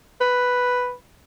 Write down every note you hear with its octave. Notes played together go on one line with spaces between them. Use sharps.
B4